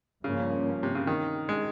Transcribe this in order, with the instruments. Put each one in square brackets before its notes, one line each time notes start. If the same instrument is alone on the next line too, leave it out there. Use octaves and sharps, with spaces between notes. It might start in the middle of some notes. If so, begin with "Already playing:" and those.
[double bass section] G2 F3 A#3 C#4 [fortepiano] C#3
[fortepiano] C3
C#3
D#3
G#3